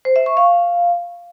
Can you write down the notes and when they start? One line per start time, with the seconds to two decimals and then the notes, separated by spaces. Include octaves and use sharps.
0.05 C5
0.16 E5
0.26 C#6
0.37 F5